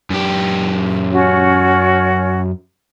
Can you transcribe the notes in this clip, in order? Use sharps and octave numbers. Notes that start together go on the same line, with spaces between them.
F#2 G4
C#4 F#4 C#5